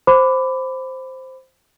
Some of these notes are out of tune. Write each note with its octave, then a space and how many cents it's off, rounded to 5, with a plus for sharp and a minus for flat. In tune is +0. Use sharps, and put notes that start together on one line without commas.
C5 +0 B5 +20 D6 -5